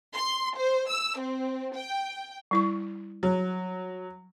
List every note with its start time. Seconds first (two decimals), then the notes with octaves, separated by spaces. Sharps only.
0.14 C6
0.57 C5
0.89 E6
1.19 C4
1.76 G5
2.51 G3 E4 C#6
3.23 F#3